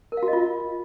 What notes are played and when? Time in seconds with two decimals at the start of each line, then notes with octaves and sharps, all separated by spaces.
0.12 A#4
0.17 F5
0.23 F#4
0.28 D#5
0.33 F4